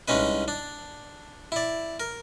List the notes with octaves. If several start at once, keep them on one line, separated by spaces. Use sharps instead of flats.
C2 G#3 C#4 D#4 B4
D4
E4 D5
A#4